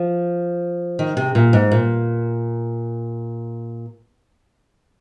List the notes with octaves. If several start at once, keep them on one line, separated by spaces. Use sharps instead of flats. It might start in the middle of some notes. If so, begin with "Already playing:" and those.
Already playing: F3
D#3
C3
A#2
G#2
A#2